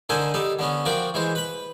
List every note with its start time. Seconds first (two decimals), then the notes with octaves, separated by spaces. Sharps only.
0.09 D3 D#4 A4 A#4 C5 G#5
0.34 G3 D#4 A4
0.59 D3 B3 C#4
0.85 F3 F#4 A#4 D5 G5
1.14 E3 G#3 C5
1.35 B4 B5